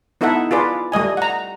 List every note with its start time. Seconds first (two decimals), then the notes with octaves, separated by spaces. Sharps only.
0.21 B3 D#4 E4 A4 E5 F#5
0.51 F4 G#4 B4 D5
0.92 G3 A3 D#5 G#5
1.17 F#5 A#5